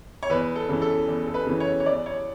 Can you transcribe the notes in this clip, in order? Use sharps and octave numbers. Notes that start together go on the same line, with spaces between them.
C#5
E2 B4
A4
C#3 E3
A4
E2
A4
B4
C#3 E3
C#5
C#5
E2 D5
C#5